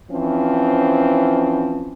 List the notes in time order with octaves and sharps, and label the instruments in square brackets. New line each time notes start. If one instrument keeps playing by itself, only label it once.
[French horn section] E3 F3 C4 C#4